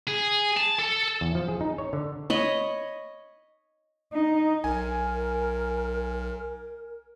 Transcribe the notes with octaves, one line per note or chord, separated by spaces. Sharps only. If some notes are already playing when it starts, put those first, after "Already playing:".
G#4
A5
A4
E2
F3
G#4
D#4
C#5
D3
C#5 D#5 B5
D#4
B1 A#4 G#5